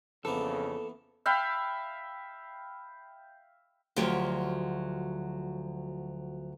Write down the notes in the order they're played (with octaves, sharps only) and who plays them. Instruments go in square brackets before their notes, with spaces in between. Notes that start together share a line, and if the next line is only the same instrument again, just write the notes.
[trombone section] F2 C#3 [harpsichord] E3 A#3 B3 [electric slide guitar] A4
[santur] E5 F5 G5 B5
[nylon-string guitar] D2 F3 F#3 G4